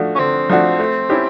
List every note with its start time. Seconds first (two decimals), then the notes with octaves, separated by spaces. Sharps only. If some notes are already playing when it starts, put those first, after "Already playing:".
Already playing: D3 F3 A3 D4 F#4
0.15 C#4
0.19 D3 C4
0.49 F3 A3 D4 F#4
0.79 A3
1.10 C#4 E4 G4